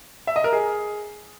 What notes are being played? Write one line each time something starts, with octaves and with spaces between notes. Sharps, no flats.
E5
D#5
A#4
G#4